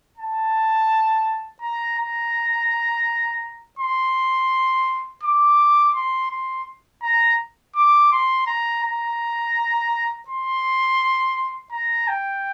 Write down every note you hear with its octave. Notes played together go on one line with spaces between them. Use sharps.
A5
A#5
A#5
C6
D6
C6
C6
A#5
D6
C6
A#5
A#5
C6
A#5
G5